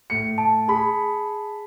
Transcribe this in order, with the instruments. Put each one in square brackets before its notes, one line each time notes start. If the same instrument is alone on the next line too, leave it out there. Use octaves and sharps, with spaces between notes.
[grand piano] A2 C#7
[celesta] A5
[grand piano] G#4 B5